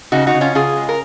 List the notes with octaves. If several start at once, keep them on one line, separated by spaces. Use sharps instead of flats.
C#3 D#4 F#4
D#4 F#4
C#3
C#4 F4
C#3 F4 G#4
G#3
A#4